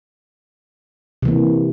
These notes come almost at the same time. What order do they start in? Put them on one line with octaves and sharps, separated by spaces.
C3 E3 A#3